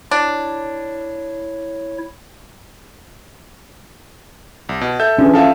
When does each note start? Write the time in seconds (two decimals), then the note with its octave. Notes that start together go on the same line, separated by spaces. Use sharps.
0.11 D4 E4 C#5
4.69 C2
4.81 B2
5.00 A4 E5 G6
5.18 D3 E3 C#4 G#4
5.34 F3 A4 E5 F5 A5